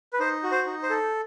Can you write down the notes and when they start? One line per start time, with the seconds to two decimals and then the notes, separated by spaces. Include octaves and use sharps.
0.13 B4
0.20 D#4 C5
0.43 F#4
0.52 C5
0.66 D#4
0.83 C5
0.90 A4